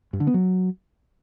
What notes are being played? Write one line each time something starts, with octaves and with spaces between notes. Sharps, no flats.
G2
D3
B3
F#3